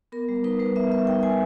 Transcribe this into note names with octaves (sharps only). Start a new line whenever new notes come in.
B3 A#4
G3
D#4 B4
G3 B4
B3 E5
G3 E5
D#4 G5
G3 G#5